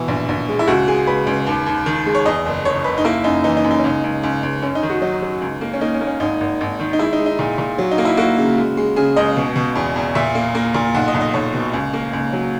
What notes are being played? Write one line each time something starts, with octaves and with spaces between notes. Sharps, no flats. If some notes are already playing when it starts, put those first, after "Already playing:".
Already playing: B2 E3
A#1
A#1
G#3
E4
C#2 F#4
G#3 G#4
C#2 B4
C#2
D#2
D#2
D#3
G#3
C#5
E2 D#5
F#1
F#1 C#5
F#1 B4
D#4
A#3 E4
F#2 D#4
E3 D#4
D#4
F#2
D#4
C#4
C#2 D#4
C#2
C#2
C#2
F#2 C#4
D#4
D#3
F#4
F#3 D#4
F#3
C#2
A#3
C#4
A#3 D#4
C#4
A#3
C#4
G#1 D#4
G#1
G#1
D#3
D#4
G#3 E4
D#4
G#3
D#4
A#2
A#2
F#3
D#4
A#3
E4
A#3 F#4
C#3
G#3
G#3
C#3 G#4
C#2 D#5
B2
B2
E2
E2
A#2 E5
A#3
A#3
A#2
B1 F#5
D#5
B1
D#5
B1 C#5
B2
C#2
A#3
C#2
F#3